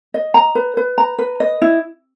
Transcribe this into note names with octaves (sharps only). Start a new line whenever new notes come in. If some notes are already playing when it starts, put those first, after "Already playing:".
D#5
A#5
B4
B4
A#5
B4
D#5
E4